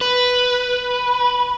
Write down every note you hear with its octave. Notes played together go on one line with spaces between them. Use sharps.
B4